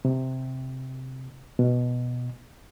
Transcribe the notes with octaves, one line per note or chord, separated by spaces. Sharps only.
C3
B2